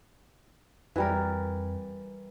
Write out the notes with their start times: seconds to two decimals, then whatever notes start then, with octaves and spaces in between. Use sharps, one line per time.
0.96 F2 E3 G3 A#4